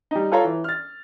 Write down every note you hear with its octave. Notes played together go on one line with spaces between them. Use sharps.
G3 D#4
F4 A4 C#5 F5 A#5
E3
F6 A6